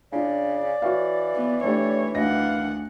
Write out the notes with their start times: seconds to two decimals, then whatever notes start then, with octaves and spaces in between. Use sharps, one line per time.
0.12 C#3 D4 F4 D5
0.82 E3 F#4 C#5 F5
1.35 B3
1.64 A3 D4 G4 C#5
2.15 D2 D4 D#5 F5 F#5 A#6